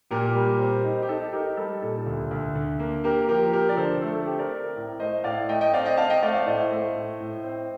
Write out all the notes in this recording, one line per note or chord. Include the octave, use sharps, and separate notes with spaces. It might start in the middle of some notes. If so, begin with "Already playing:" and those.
A#2 G4 A#4
G3
C4
D#4
G4
D#4 A4
D#4 G4 A#4
G3 A4
A#2 A4
D2
D2
D3
A#3
A#3 G4 A#4
F3 G4 A#4
F3 G4 A#4
D5
D3 A4 C5
A3 A4
A4
C4 G4
A#4 D5
C4
A2
A3 C5 D#5
A2 D5 F5
A3 D#5 G5
D#5 G5
C4 D5 F5
D#5 G5
C4 F5 A5
D#5 G5
A3 D5 F5
D5 F5
A2 C5 D#5
A3
A2
A2
C4